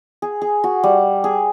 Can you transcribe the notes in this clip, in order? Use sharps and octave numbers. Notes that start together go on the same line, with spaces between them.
G#4
G#4
F#4
G3
G#4